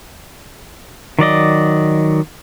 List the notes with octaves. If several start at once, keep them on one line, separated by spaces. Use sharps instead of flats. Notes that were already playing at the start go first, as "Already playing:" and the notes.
D#3 F#3 D5 D#5